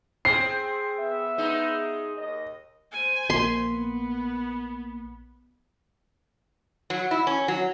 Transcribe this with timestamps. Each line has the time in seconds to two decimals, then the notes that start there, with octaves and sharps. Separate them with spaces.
0.25 C4 G#4 C7
0.98 B3 B4 E5
1.38 G#3 D#4
2.16 D#2 D#5
2.92 C5 G#5
3.30 A#1 A#3 C6 B6
3.69 B3
6.90 F#3
7.11 E4
7.27 C#4
7.48 F#3